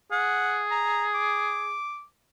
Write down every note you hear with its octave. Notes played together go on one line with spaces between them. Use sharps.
G#4 F#5
A#5
D6